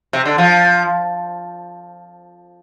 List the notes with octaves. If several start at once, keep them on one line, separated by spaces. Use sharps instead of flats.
C3
D3
F3